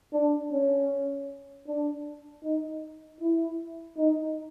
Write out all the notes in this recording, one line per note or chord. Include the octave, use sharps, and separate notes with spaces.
D4
C#4
D4
D#4
E4
D#4